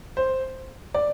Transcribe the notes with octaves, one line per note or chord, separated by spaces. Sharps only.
C5
D5